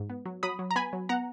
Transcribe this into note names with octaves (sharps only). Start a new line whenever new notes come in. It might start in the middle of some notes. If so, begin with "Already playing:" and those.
Already playing: G#2
B3
F#3
F#3 B5 D#6
F#3
A#5
B3 G#5 B5
F#3
B3 F#5 A#5